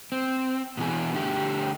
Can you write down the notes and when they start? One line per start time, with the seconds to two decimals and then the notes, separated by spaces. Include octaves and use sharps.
0.12 C4
0.77 B2 E3 G#4
1.14 D3 A3 G4